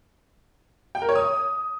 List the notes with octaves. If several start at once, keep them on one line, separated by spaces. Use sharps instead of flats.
G5
A#4
C#5
D#6